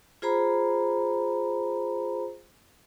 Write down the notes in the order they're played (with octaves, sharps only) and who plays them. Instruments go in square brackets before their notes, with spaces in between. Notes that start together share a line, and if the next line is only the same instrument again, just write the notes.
[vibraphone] F4 G#4 C5 A#5 B5